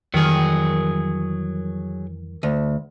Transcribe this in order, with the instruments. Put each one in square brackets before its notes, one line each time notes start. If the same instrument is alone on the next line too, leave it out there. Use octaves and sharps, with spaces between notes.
[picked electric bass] F2 E3 G3 [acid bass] D#3 [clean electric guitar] F#3 G#4
[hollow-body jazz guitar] D2